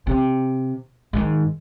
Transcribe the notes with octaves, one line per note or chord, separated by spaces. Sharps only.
C3
G#2 D#3